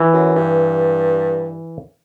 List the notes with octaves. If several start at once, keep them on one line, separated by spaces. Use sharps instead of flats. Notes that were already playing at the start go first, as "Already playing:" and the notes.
Already playing: E3
F#2
G2